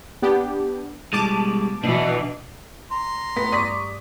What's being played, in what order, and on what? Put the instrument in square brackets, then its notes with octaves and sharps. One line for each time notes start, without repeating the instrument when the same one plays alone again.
[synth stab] B3 D4 G4
[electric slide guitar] B2 G3 G#3 [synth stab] A5 D6
[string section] B2 E3 [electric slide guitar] D4
[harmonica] A#5 C6
[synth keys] A2 A3 [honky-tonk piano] B3 B6
[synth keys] G2 D5 D#6 [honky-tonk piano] C#6 B6